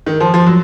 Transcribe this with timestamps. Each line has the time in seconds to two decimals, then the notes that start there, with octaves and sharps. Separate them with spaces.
0.06 D#3
0.20 F3
0.34 F3
0.47 F#3